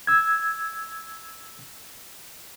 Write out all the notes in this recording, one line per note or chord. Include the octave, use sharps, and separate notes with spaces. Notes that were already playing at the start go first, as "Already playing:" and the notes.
E6 G#6